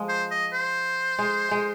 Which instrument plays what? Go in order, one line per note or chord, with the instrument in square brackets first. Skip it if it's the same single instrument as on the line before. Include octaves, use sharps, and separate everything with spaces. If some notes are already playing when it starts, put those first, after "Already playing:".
Already playing: [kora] F3 G#3
[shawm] C5
D#5
C5
[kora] G#3
G#3